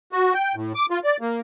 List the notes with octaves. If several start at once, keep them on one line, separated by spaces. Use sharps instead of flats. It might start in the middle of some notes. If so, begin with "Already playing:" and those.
F#4
G5
A2
D6
F4
D5
A#3